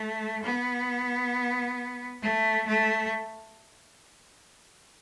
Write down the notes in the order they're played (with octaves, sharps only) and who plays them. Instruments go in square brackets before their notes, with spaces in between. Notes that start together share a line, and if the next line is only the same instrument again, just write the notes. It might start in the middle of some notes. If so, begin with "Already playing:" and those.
Already playing: [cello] A3
B3
A3
A3